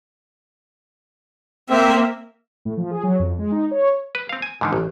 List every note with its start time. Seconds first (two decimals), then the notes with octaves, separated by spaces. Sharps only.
1.70 A#3 C4 E5
2.65 A2
2.77 F3
2.91 G#4
3.04 F#3
3.20 F2
3.39 G#3
3.52 D#4
3.71 C#5
4.15 B4
4.29 C4 F5
4.42 G#5
4.61 G#2 D3 D#3
4.73 A1